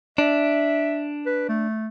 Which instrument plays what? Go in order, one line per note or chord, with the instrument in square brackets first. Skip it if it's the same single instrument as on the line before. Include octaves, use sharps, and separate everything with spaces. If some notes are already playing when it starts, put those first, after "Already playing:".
[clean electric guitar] D4 [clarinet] E5
[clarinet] B4
A3